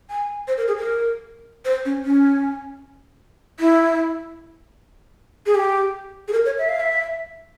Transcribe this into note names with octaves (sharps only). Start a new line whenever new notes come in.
G#5
C5
A#4
G#4
A#4
C5
C#4
C#4
E4
G#4
G4
G#4
A#4
C#5
E5
F5
E5